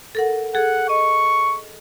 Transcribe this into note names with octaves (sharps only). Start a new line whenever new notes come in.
A4 A#4 F#5
G#4 A4 F#5
D#5 C#6